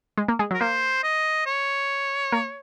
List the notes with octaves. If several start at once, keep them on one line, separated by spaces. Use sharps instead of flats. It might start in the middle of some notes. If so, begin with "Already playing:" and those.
G#3
A#3
G#3
F#3
A#4
A#3 C5
D#5
C#5
A#3